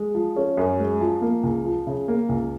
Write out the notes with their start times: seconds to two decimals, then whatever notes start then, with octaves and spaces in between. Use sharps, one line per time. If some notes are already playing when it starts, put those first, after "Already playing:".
Already playing: G#3
0.15 F3
0.36 C#4
0.57 F#2
0.79 G#3
1.01 F3
1.22 A#3
1.43 C#2
1.65 F3
1.87 C#3
2.08 A#3
2.29 C#2